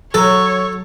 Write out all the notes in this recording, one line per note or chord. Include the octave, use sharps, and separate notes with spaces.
F#3 A4 C#5